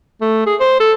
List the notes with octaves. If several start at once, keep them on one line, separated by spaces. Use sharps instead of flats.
A3
G#4
C5
A4